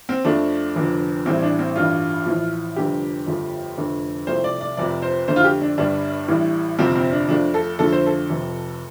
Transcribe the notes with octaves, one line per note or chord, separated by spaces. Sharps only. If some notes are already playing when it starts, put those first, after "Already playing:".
C4
F2 F3 A3 D4
F1 F2 D3
A1 A2 G3 C4
D4
C4
A1 G2 G3 F4
A1 A2 F3
F1 F2 D3 G3 G4
G1 F2 F3 A3
F1 F2 D3 A3
C2 C3 F3 A3 C5
D5
D5
F1 F2 C3 D5
C5
F2 D3 A3 C5
F4
G4
D4
G1 G2 G3 D4
A1 A2 G3
G1 F2 C3 F3 C4
C4
D4
F2 F3 A3 D4
A4
F2 D3 F3 A3 A4
C5
A4
F1 F2 C3